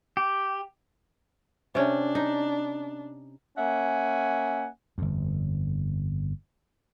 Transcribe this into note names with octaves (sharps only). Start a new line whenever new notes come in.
G4
C3 C#4 D4
D#4
A#3 C#4 E5 F#5 G#5
G1 F2